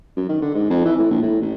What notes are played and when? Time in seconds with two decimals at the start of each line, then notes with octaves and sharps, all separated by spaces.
0.16 F#2
0.29 D#3
0.42 D3
0.54 G#2
0.70 F2
0.85 E3
0.99 A2
1.11 A#1
1.22 A2
1.41 A1